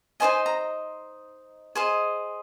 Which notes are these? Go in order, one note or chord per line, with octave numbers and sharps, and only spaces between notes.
D#4 G#4 C5 D#5 G#5
A#5
G#4 C5 D#5